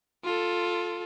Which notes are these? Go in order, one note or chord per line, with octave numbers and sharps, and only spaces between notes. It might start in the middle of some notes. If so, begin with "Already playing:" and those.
F4 A4